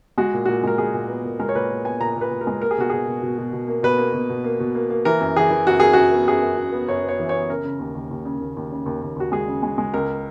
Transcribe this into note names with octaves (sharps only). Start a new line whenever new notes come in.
G#3 F#4
A#2
A#2 F#4
G#3 A#4
G#3 G#4
A#2
B3
A#2
G#3 A#4
C#5
A#2 B4
A#2
B3 G#5
A#2 A#5
A#2
B4
A#2
A#4
G#3
A#3 A#4
G#4
B2 F#4
B2 G#4
B2
B2
B2
B2
A#3
B2 B4
A#3
B2
B2
A#3
B2
A#3
A#3
E3 A#4
F#2
E3 G#4
E3
F#2 F#4
F#2 G#4
F#2 F#4
B3
F#2 G#4
F#2
F#2
B3
F#2 C#5
B3 C#5
E3
B3 C#5
C#3 A#4
C#3
D#2
D#2
D#2
C#3
D#2
D#2
C#3
D#2
D#2
D#2 F#4
G#3 G#4
C#3
G#3
G#3
C#2 A#4